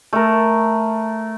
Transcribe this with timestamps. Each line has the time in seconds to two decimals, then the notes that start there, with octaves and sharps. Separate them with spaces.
0.13 A3 A#4